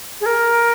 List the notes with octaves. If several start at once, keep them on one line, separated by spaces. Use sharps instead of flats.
G#4
A#4